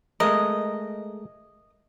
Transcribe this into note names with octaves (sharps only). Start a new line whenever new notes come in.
G#3 A3 A#4 D#5